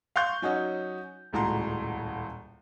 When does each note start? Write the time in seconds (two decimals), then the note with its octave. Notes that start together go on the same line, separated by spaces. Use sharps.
0.16 F5 C6 C#6 G6
0.42 F#3 C#4 D#4 F#4
1.33 D#1 C#2 A2 F#4 A#5 C6